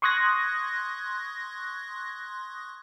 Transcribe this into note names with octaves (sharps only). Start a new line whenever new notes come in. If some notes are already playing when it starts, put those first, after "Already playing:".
C6 C#6 D#6 F#6 G#6 A#6